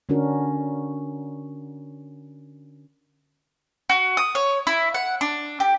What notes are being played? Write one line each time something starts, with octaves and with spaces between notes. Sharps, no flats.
D3 C#4 D4 F#4 A#4
F#4
D#6
C#5
E4
F#5
D4
G4